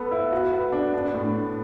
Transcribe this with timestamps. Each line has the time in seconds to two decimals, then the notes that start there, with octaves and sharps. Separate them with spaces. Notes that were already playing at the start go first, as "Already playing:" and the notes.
Already playing: B3 A4
0.11 E4
0.32 F#4
0.53 B3
0.72 D4
0.94 D4
1.14 A2